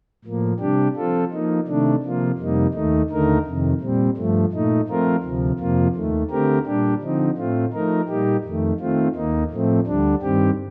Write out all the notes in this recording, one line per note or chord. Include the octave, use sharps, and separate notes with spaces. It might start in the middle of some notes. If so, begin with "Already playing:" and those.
A2 F3 A#3
C3 G3 D4 G4
F3 C4 F4 A4
F3 A#3 D#4
C3 D#3 A3 D4
C3 F3 A#3 F4
F2 C3 G3 A#3 D#4
D#2 D#3 A3 D#4
D#2 D3 A3 D#4 A#4
F2 C3 D#3
A#2 G3 C4
G2 F3 A3
A#2 A3 D#4
F3 A3 C4 F4 A#4
D2 C3 F3
F2 C3 F3 A#3 F4
D#2 D#3 A3
D3 A3 C4 G4 A#4
A#2 G3 D4 G4
D3 F3 C4 D#4
A2 A3 C4 F4
F3 A3 D#4 A#4
A#2 G3 A#3 D#4 G4
F2 D#3 A3
D#3 A3 C4 F4
D#2 D#3 A#3 D#4
A2 F3 A3 C4
D2 D3 G3 D4
G2 D#3 G3 C4 G4